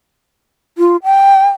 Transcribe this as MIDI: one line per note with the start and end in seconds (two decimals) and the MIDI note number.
0.78 0.96 65
1.04 1.46 79